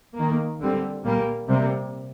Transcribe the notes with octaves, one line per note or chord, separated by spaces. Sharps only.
D#3 A#3
D3 G3 C4
A#2 G3 A#3
C3 G3 A#3